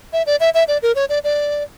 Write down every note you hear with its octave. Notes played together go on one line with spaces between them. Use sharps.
E5
D5
E5
E5
D5
A#4
C#5
D5
D5